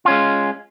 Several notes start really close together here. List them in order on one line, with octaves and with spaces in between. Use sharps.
F4 C#4 G#3